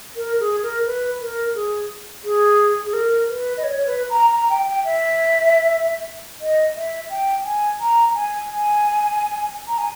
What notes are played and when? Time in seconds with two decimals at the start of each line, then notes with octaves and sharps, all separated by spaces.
0.16 A#4
0.40 G#4
0.63 A#4
0.86 B4
1.21 A#4
1.55 G#4
2.24 G#4
2.86 G#4
2.93 A#4
3.29 B4
3.57 D#5
3.64 C#5
3.76 C#5
3.87 B4
4.10 A#5
4.33 A#5
4.50 G5
4.68 G5
4.85 E5
6.41 D#5
6.76 E5
7.10 G5
7.45 G#5
7.80 A#5
8.15 G#5
8.49 G#5
9.68 A#5
9.78 G#5